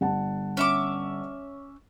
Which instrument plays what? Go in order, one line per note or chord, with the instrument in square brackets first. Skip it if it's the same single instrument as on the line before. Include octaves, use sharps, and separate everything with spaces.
[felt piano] G1 F#5 A5
[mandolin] C#4 E5 D6